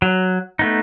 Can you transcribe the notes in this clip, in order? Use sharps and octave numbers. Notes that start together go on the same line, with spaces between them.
F#3
A3 B3 D#4